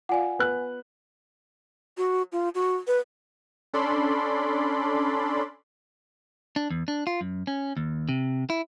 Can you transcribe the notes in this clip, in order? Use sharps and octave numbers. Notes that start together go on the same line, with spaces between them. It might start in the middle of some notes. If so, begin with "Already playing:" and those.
F4 D5 F5 F#5 G#5
B3 F#6
F#4
F4
F#4
B4
C#4 D4 A4 D5 B5 C6
D4
E2
D4
F4
F#2
C#4
D#2
C3
E4